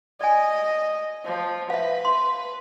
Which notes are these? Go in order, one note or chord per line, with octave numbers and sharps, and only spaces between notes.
D5 D#5 G#5
F3
B4 E5 F5
C6